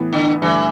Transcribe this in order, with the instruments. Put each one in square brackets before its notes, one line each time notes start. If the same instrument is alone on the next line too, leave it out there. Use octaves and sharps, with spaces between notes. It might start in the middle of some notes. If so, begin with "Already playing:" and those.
Already playing: [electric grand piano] A2 E3 B3
[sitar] D3
[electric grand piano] G2 D3 A3 [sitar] E3